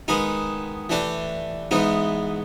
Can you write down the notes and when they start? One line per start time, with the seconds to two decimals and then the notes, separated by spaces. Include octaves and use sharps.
0.08 D#3 G#3 B3 D#4 G#4
0.90 E3 A3 D4 G4
1.71 G#2 E3 G#3 B3 D#4